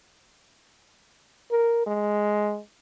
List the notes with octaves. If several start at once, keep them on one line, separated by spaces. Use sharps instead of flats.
A#4
G#3